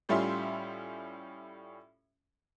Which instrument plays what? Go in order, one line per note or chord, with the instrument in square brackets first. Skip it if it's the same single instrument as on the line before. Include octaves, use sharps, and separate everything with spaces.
[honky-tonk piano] A2 G3 C#4 F4 E5 C6